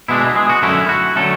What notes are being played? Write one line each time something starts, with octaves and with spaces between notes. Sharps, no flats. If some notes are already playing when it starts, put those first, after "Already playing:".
B2 G#3 D4 E4
G#3 G#4
F#4
F#2 D3 A3 C#4 E4
F#4
D3 F#3 A3 C#4 A4